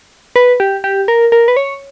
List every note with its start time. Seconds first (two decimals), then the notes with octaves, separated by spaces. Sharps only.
0.36 B4
0.60 G4
0.84 G4
1.08 A#4
1.32 A#4
1.48 B4
1.57 C#5